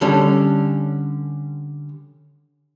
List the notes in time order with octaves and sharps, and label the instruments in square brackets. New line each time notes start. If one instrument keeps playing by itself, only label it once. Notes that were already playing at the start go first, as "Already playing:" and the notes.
[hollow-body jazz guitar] D3 G3 C#4 A4